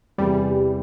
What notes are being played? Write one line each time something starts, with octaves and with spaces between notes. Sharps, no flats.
E2 C3 E3 G3